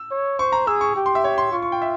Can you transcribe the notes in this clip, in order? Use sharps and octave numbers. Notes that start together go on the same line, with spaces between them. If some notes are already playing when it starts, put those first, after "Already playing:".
Already playing: E6
C#5
C5 C#6
A#5
G#4 E6
C#6
G4
C6
E5
C#5
C6
F4 C#6
C#6
G5
E5